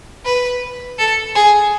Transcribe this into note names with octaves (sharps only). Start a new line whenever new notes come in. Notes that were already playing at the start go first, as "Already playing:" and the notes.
B4
A4
G#4